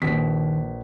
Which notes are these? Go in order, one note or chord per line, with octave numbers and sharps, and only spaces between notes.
A#1 D#2 B4 B6